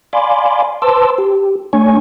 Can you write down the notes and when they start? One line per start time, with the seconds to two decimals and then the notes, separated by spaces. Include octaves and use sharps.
0.13 D5 F5 G#5 B5 C6 D6
0.82 B4 C5 A5 C6 D6 E6
1.18 G4
1.73 A3 D4 C#5 G#5 C#6